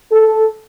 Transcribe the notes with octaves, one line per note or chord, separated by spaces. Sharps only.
A4